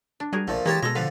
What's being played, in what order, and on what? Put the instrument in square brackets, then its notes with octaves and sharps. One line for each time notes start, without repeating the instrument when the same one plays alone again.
[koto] D4
[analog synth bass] G3 [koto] F#4 G#4 A#4
[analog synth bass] B1 [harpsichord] A#2 F3 [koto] A3
[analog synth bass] E3 [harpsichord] G#3 G4 A5 [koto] A#3 C#5
[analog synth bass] B2 [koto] G#3 A4 [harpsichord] A#5
[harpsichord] D3 F3 [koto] B4 F5